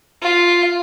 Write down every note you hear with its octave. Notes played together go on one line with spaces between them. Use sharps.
F4